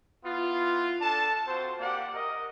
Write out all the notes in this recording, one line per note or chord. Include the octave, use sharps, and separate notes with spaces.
B3 E4 F4
D4 A4 A5
C4 F4 F#4 C5
A#3 G4 D5 F#5 D6
A#4 D#5